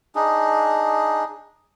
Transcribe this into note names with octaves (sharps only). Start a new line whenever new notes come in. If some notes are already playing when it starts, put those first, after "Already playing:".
D4 D#4 G#4